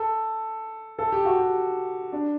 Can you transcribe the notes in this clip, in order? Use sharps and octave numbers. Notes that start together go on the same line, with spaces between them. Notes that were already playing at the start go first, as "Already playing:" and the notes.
Already playing: A4
A4
G4
F#4
G4
D4